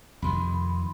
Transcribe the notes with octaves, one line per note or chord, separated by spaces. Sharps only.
F2 C3 D#3 B5 C6